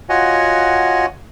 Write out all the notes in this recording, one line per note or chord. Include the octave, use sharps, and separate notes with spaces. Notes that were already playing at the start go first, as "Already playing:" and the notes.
F4 F#4 C#5 D#5 F#5 G#5